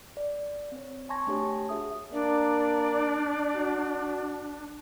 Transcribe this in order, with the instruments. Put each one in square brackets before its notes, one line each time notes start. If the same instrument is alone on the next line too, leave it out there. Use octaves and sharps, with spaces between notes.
[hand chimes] D5
C4 C#5
G#5 A5 C6 C#6 G#6 A#6
A3 D4 F#4 G4 C#5 A5
F#4 G#4 E5 D#6
[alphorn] A#3 [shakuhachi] D4 [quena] D5
[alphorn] F#4